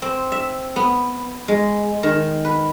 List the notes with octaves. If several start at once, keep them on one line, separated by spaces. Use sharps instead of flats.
C4
E5
B3
G#3
D#3
B4